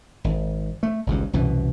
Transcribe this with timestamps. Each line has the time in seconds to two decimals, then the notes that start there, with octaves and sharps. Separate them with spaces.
0.24 G#1
0.83 A3
1.06 G#1 C#2 G2
1.33 C2 F#2 B2 E3